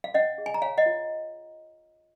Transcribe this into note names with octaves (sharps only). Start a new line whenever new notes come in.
F5
C#4 D#5 F#5
G#4
G#5
A#5
C#5 F5 G#5
D#5 F#5
F4